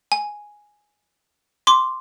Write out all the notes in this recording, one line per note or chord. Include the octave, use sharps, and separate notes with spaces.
G#5
C6 D6